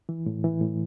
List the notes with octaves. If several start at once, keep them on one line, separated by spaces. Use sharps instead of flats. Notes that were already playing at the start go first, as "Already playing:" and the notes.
E3
A2
E3
A2